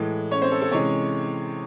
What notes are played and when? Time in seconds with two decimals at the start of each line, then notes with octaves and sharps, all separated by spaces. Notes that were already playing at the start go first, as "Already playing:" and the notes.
Already playing: A2 E3 G#3
0.31 C#4 C#5
0.42 C4 C5
0.52 A4
0.62 A4
0.71 C3 E3 G#3 C#4 C#5